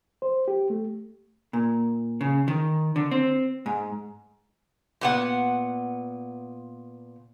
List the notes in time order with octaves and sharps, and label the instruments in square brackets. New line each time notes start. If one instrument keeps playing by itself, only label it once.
[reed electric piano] C5
G4
A3
[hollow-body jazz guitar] A#2
C#3
D#3
D3
C4
G#2
[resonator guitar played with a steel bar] A#2 B3 F#5